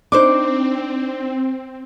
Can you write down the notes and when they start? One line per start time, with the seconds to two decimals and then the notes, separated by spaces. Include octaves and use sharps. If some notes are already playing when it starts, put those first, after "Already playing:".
0.12 C4 D4 D#4 C5 D6